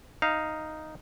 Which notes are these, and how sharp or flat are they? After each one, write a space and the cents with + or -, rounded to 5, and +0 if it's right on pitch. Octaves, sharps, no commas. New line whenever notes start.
D#4 +0 F5 -10